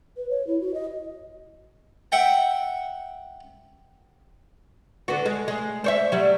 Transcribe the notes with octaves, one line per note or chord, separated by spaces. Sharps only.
B4
C#5
E4
F#4
D#5
E5 F#5 G5
D3 B3 F#4
G#3
G#3
C5 C#5 E5
F#3 G3